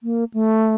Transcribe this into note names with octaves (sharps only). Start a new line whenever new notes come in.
A#3
A3